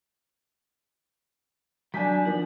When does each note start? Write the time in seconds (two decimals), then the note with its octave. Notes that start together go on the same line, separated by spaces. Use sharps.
1.94 F#3 D4 G#5 G6 B6
2.25 D#3 F3 D4 F#5